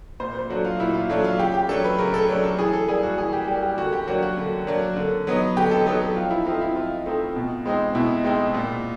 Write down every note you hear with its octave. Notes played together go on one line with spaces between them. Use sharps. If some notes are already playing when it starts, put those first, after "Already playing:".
A#2 C5
C5
F#3 A3 D4 F#4
F4
A#2 E4
F4
F#3 A3 D4
F4
C#3 G4
G4
F#3 A3 D4 A4
B4
C#3 A#4
A4
F#3 A3 D4
A4
E3 G#4
A4
G3 A#3 G#4
F#4
E3 G#4
G4
G3 A#3 G4
G4
D3 F#4
G4
F#3 A#3 D4 F#4
F#4
D3
F#3 A#3 D4
D3
F#3 B3 D#4
D3 G4
A4
F#3 B3 D#4 A4
A4
F3 F4
E4
A3 C4 D#4 F4
E4
F3 F4
A3 C4 D#4
B2
G#3 C4 D#4
B2 E4
G#3 C4 D#4
A#2